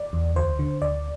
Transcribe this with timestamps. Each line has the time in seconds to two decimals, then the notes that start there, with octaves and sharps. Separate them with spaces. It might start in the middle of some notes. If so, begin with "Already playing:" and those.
Already playing: D5
0.13 E2
0.36 D2 C5
0.59 D3
0.82 D2 D5